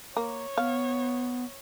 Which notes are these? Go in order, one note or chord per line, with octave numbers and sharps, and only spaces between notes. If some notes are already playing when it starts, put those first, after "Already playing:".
A#3 C#5
B3 F5